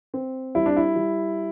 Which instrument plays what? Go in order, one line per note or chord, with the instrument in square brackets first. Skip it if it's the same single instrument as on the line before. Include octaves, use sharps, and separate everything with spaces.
[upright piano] C4
[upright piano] G3 [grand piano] E4
[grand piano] D4
E4
[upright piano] G3